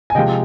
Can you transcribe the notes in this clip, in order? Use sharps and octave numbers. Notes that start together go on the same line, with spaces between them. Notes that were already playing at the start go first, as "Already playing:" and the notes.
G#5
C3 F3 G#3 D#5 G5